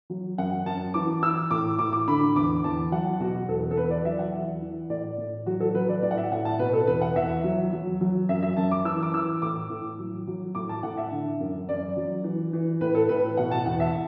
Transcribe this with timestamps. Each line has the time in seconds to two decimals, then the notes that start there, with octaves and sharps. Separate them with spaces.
0.10 F#3
0.38 F#2 F#5
0.66 F#2 A5
0.94 E3 D6
1.22 E3 E6
1.51 A2 D6
1.79 A2 D6
1.93 D6
2.08 D3 B5
2.36 E2 D6
2.64 E2 A5
2.92 F#3 F#5
3.20 B2 F#4
3.49 E2 A4
3.71 A4
3.77 E2 B4
3.91 D5
4.05 F#3 E5
4.19 F#5
4.34 E3
4.62 E3
4.90 A2 D5
5.18 A2
5.46 F#3 F#4
5.60 A4
5.74 F#3 B4
5.89 D5
6.02 A2 D5
6.11 F#5
6.17 E5
6.32 A2 F#5
6.45 A5
6.59 B2 B4
6.73 A4
6.87 E2 B4
7.01 F#5
7.16 E2 E5
7.44 F#3
7.73 F#3
8.01 F#3
8.29 F#2 E5
8.43 E5
8.57 F#2 A5
8.71 D6
8.85 E3 E6
9.03 D6
9.14 E3 E6
9.42 A2 D6
9.70 A2
9.99 F#3
10.27 F#3
10.55 A2 D6
10.69 A5
10.83 A2 F#5
10.97 E5
11.11 D3
11.40 F#2
11.69 F#2 D5
11.97 F#3
12.24 E3
12.53 E3
12.81 A2 B4
12.95 A4
13.09 A2 B4
13.37 B2 F#5
13.51 A5
13.65 E2 F#5
13.80 E5